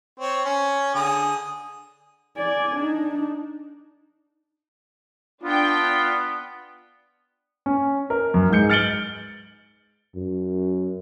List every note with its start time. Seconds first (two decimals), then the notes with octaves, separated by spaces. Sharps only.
0.20 C4 C#5
0.45 C#4
0.95 D3 G#4 D#6
2.37 D5 G#5
2.76 D4 D#4
5.44 B3 D4 F4 G5
7.66 C#4
8.10 A#4
8.34 F#2
8.50 G#2 G#3 G6 C#7
8.70 F6 A6 C#7 D7 F#7 G7
10.15 F#2